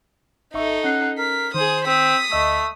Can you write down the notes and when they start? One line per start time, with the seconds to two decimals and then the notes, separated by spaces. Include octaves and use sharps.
0.54 G#1 D#4 A4 E5 C#6
0.84 C#4 F#5 C7
1.18 A#4 B6
1.54 D#3 G#4 C5 D#6
1.86 C4 D#6 B6
2.32 D2 A3 D#5 E6